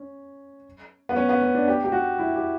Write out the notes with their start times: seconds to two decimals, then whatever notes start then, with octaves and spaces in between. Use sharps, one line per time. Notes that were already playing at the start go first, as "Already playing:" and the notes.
Already playing: C#4
1.09 B3
1.16 C#4
1.29 B3
1.42 C#4
1.54 D4
1.68 G4
1.84 G4
1.92 F#4
2.19 E4
2.36 G4